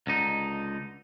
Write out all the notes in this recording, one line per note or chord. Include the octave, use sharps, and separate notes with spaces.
C#2 D3 D#4